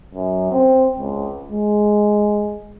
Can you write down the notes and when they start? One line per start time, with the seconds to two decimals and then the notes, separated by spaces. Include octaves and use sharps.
0.15 F#2
0.52 C4
0.99 C#2
1.51 G#3